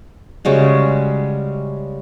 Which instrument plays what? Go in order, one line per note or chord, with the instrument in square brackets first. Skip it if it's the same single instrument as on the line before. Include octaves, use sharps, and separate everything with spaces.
[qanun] C#3 G3 G#3 F#4